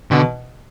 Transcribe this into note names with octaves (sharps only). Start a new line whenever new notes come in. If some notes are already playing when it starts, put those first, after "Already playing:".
B2 D3